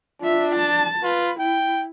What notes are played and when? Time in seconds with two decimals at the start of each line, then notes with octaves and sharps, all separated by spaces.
0.21 D4 F4 E5
0.56 A5
1.03 F4 B4
1.40 E4 G5